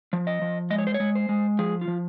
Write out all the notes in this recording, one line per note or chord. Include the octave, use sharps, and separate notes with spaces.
F3
D#5
F3
G#3 D#5
C#5
C5
C#5
G#3
C5
G#3
F3 G#4
F4
F3